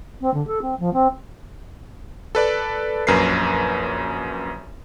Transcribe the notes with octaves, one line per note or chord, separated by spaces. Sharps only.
C4
D3
A4
C4
F3
C4
A4 B4 D5
A#1 F#2 A#4 B4 C7